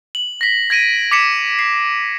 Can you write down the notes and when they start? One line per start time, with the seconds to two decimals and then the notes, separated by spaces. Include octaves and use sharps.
0.15 F#7
0.41 A#6 B6
0.70 G#6 A#6 D7 D#7
1.11 D6 B6 C#7 E7
1.59 C7